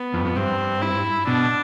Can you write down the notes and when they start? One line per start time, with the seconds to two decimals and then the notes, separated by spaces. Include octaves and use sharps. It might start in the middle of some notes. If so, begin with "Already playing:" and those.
Already playing: B3
0.14 F2
0.25 F2
0.36 G2 C4
0.82 E4
1.27 B2 D4